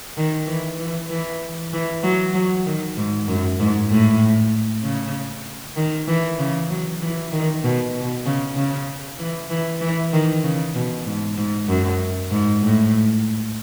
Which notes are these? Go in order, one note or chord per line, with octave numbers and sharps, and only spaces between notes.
D#3
E3
E3
E3
E3
F#3
F#3
D#3
G#2
F#2
G#2
A2
C#3
D#3
E3
C#3
F#3
E3
D#3
B2
B2
C#3
C#3
E3
E3
E3
D#3
C#3
B2
G#2
G#2
F#2
G#2
A2